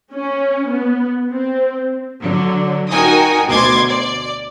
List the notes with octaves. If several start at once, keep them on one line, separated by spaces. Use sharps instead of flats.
C#4
B3
C4
D3 F#3
D#4 F#4 A#4 G5 G#5 D#6
D2 B2 C6 D6 G#6 A6
D5